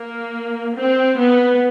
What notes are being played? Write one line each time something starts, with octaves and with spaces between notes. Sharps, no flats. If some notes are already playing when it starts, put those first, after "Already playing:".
Already playing: A#3
C4
B3